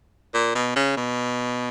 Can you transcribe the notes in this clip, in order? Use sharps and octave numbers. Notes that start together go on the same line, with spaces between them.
A#2
B2
C#3
B2